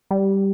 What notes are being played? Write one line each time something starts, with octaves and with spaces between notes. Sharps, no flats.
G3